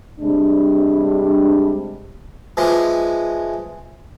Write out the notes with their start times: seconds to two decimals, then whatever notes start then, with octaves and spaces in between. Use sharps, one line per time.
0.20 C3 G3 G#3 D4
2.57 E3 F3 G#3